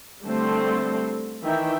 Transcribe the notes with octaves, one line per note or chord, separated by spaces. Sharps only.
D3 G3 A3 C4 A4 C5
D#3 E3 E5 G5